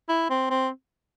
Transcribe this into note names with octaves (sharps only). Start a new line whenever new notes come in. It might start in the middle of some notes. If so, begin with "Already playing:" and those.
E4
C4
C4